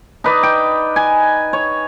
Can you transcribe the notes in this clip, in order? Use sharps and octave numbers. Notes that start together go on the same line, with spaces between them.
D#4 B4 D5
G5
G#5
C#5